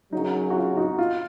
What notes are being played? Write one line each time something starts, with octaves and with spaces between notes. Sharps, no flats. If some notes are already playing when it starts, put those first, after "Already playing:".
F#2 C#3 F#3 D#4
F#4
F4
D#4 F#4
F4